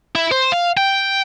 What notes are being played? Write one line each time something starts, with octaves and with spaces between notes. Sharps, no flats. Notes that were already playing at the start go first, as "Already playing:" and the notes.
E4
C5
F5
G5